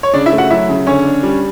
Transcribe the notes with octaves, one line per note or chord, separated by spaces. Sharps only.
C#5
C#3 D4 D5
E4 E5
A3
F#4 F#5
F#3 E4 E5
C#3
D3 C#4 C#5
D4
G3